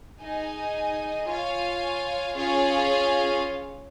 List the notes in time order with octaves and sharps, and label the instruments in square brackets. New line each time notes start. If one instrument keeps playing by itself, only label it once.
[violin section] D#4 G#4 D#5 G#5
F4 C#5 F5 G#5
C#4 F4 G#4 C#5 F5